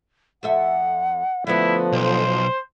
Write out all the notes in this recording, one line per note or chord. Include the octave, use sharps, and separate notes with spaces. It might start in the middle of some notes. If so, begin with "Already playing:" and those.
F2 A4 E5 F#5
D3 F3 A3 B3 E4
B1 C5